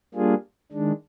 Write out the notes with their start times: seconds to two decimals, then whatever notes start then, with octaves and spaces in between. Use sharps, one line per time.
0.14 G3 A#3 D4 F4 G#4
0.72 D#3 G#3 D4